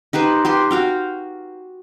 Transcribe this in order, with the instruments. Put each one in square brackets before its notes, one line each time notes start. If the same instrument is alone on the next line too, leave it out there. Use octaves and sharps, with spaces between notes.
[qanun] D#4 G4 B4 C5
G4 B4 C6
F#4 F5 G5